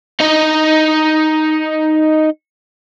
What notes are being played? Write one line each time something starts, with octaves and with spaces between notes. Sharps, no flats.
D#4 D#5